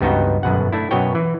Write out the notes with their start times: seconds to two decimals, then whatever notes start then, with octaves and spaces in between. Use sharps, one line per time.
0.01 C#2 G2 B3 D#4 F#4 G5
0.43 G1 F#2 B2 F#5
0.72 A3 D4 E4
0.91 F#2 B2 F#4 B4 C#5 G5
1.15 E3